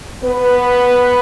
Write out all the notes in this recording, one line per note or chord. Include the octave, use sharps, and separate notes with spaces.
B3 B4